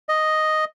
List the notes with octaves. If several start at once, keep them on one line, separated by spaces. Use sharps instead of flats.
D#5